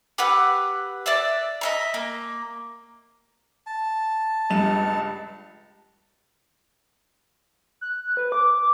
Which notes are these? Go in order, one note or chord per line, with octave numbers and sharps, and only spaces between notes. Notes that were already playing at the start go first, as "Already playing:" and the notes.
G4 B4 F#5 E6
D5 E5 F#6
D#5 E5 A#5
A#3
A5
C#2 G2 E7
F#6
B4
D6